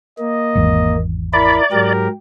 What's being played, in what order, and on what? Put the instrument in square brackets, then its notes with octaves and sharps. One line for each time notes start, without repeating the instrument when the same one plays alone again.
[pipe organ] A#3 [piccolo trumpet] D#5
[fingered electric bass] G#1 E2
[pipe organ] E4 A#4 [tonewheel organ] D5 [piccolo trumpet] B5
[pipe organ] G#2 F#3 G4 [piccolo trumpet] A#4